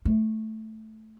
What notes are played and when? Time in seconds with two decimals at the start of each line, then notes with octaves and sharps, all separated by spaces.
0.05 A3